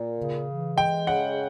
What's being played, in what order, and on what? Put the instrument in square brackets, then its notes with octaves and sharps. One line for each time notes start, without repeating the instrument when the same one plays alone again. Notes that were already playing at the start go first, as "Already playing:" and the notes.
Already playing: [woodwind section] A#2
C#3
E3
[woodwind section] G#3 [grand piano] G5
[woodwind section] C#3 [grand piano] F#5